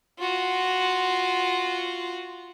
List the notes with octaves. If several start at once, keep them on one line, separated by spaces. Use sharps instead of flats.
F4 F#4